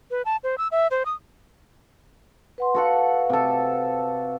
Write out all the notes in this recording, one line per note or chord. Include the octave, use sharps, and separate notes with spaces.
B4
A5
C5
E6
E5
C5
D#6
B4 F#5 C6
F#4 A4 B4 F5 F#5
C3 A4